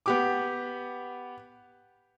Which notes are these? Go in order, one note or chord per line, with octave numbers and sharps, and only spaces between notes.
B3 G4 D6